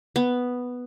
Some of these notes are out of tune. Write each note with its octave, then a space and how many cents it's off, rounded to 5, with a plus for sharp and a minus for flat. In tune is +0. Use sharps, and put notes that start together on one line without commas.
B3 +0